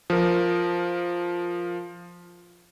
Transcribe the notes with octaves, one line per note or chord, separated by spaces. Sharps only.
F3 A#4